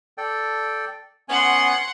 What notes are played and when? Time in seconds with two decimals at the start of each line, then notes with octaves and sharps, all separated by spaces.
0.18 A4 D5 G5
1.29 B3 C#4 F#5 G#5 C6